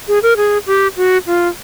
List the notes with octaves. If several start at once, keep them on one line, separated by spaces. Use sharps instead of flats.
G#4
A#4
G#4
G4
F#4
F4